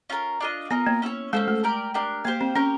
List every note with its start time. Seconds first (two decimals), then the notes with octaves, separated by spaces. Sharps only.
0.10 C#4 F4 A#4
0.40 D4 F4 A#4 D#5
0.70 B3 F4 A#4 D#5
0.86 A#3
1.02 C#4 E4 A4 C#5
1.33 G#3 C#4 E4 A4 C5
1.48 A3
1.64 G4 A#4 D5
1.94 D4 G4 A#4
2.24 A#3 G4 C5 F5
2.41 C4
2.55 C#4 G4 A#4 C#5